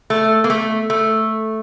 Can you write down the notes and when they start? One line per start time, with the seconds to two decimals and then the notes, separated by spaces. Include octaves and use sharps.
0.10 A3
0.44 A#3
0.50 A3
0.90 A3